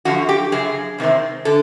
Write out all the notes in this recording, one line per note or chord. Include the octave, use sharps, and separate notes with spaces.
F#2 D3 F3 F#4
G4
F#2 C#3 G#4
E2 C3 D#3 G#3 C4
D3 A4